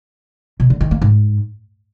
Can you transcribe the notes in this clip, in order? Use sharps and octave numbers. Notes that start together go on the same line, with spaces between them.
B2
D3
D#3
A#3
G#2